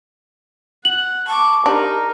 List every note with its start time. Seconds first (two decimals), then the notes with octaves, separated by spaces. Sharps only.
0.85 F#5 F#7
1.28 A5 C#6 D6
1.66 D4 D#4 G4 A#4